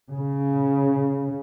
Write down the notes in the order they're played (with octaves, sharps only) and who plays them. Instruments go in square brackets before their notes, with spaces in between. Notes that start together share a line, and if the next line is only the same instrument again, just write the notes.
[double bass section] C#3